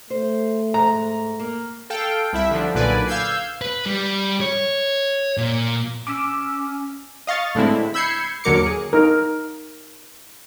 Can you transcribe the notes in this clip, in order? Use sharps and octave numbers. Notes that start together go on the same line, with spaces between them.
A3 C5
G#2 A#5
A#3
A4 F5 G5
C2 E4 E5
D3 F3 D4
B1 A#2 D3 B4 D5 G#5
F5 E6 G6 G#6 C7
B4
G3
C#5
A#2
C#4 D6 E6
D#5 F5 C#6 A6
A2 D3 G#3 C4 E4
B5 E6 G6 G#6 C7 C#7
D#2 D3 F#3 A#4 D6 C#7
G#4
D#4 A#4